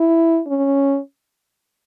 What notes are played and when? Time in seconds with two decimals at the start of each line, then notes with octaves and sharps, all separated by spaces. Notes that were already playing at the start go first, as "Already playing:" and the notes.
Already playing: E4
0.47 C#4